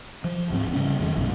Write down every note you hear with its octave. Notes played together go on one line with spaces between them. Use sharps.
F3
D1 G#2 F3 C4
C#3 G3 C#4
F2 D#3 G#3
A#1 F#2 B2